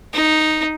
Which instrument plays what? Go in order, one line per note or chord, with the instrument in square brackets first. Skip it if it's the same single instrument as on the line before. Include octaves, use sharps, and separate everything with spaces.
[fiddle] D#4